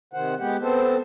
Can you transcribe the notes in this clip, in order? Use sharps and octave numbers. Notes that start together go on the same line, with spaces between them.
C3 D#3 C5 F#5
G#3 B3 G4 F#5
B3 C4 A4 C5